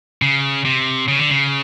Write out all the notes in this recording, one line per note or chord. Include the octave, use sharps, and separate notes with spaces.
C#3
C3
C#3
D3
C#3